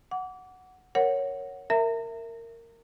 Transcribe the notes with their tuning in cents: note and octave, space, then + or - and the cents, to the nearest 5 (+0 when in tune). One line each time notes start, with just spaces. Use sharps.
F#5 +0 D6 -30
A#4 +0 C#5 +0 F#5 +0
A#4 -15 E5 +0 A#5 -40